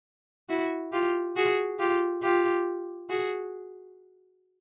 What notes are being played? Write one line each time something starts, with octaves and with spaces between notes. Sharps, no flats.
E4 F#4
F4 G4
F#4 G#4
F4 G4
F4 G4
F#4 G#4